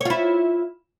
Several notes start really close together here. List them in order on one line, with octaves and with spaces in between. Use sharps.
C#5 F4 E4